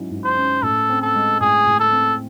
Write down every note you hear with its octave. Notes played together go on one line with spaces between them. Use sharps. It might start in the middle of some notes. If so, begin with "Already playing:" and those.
Already playing: G#2 F#3 C#4 E4
G#2
C5
C#4
A2 A4
C4
A4
G#3
A2 G#4
A2
A4
C4